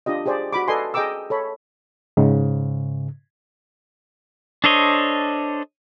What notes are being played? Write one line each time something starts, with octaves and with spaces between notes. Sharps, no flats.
D4 F4 G4 D#5
G4 G#4 C5 D5
F#4 B5 D6
A4 B4 D5 D#5 G#5 C6
G#4 D#5 G5 A#5 D6 E6
A4 C#5 B5
G#2 C#3
D4 A4 C5 C#5 D#5